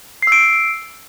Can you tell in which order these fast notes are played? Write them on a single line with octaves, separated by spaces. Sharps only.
C7 E6 D7